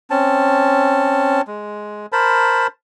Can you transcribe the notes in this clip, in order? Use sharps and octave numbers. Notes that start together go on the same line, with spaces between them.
C4 C#4 A5
G#3
A#4 C5 A5 B5